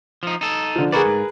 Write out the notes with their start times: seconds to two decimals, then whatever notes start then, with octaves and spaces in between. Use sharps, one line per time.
0.23 F3 D#4
0.41 D#4 A4
0.76 D3 F3
0.92 D3 F#4 G#4 A#4 B4 D5
1.05 G#2